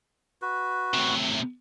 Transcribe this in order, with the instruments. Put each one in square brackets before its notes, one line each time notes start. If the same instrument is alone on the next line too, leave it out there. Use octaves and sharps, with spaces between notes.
[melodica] F#4 B4
[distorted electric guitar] A2 C3